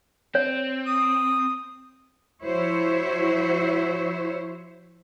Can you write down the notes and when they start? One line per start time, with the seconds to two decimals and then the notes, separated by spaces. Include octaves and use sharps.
0.35 C4 C#5
0.86 D#6
2.43 F3 E4 F#4 C5 C#5 E5